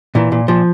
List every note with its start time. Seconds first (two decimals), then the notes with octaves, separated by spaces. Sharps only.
0.15 A#2 E3
0.32 A#2
0.48 A#2 F3